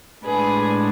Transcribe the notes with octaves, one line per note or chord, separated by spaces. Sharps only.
A2 G#3 D4 G#4 B4